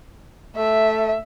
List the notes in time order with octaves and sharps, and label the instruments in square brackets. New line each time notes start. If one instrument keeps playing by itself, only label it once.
[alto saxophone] A3 [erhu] E5